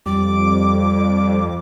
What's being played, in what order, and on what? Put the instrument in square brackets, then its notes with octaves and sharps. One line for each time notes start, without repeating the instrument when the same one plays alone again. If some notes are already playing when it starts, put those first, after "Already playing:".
[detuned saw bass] F2 [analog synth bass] G3 [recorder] D6